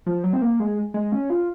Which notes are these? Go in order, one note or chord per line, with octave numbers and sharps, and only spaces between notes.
F3
F#3
C4
A#3
G#3
G#3
C#4
F4